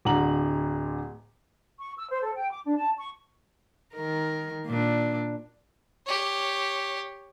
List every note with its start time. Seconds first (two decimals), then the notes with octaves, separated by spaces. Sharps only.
0.05 D1 D3 A#5 F#7
1.79 C#6
1.96 E6
2.09 C5
2.22 A4
2.35 G5
2.50 D6
2.65 D4
2.77 A5
2.97 C#6
3.94 D#3 A#4
4.67 A#2 D4
6.06 G4 C#5